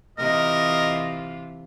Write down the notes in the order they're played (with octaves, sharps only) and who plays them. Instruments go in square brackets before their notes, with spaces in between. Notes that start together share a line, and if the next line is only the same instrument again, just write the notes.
[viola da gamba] C3 E3 F4 [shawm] A#4 [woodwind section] D#5